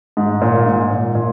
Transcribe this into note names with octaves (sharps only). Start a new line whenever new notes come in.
G#2
A#2
G#2
A#2
A#2